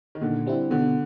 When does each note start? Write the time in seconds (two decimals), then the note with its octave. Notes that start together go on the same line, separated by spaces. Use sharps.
0.15 D#3
0.21 A#2 D3
0.47 G3 C4 E4
0.70 B2 D3